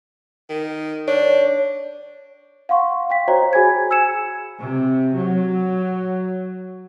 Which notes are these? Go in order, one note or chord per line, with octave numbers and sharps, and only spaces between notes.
D#3
D4 C#5
F5 F#5 C6 C#6
F5 G5 B6
F#4 C5 C#5 D#5 A#5
F#4 G#4 G#5 B5 G#6
G#5 E6 G#6 C#7 E7
C3
F#3